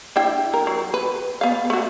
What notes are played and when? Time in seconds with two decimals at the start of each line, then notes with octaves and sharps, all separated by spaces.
0.16 D4 E4 G5
0.54 A#4
0.67 F#3
0.94 B4
1.41 B3 F5
1.70 A3 F#4